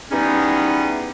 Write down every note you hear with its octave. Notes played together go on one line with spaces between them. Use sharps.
E3 G3 B3 C#4 D#4 G#4